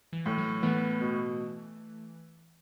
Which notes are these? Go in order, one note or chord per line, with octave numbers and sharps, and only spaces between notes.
E3
A2
F#3
E3 A3 B3
B2